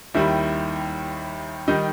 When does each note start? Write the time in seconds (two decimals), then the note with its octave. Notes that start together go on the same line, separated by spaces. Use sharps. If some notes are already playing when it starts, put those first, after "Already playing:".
0.14 D#2 D#3 G3 E4
1.68 D#3 G3 D#4